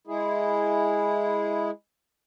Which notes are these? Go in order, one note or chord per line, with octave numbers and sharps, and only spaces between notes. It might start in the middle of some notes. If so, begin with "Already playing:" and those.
G#3 E4 G#4